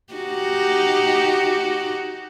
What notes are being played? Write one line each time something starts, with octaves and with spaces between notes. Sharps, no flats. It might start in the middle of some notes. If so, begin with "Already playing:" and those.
D#4 F#4 G4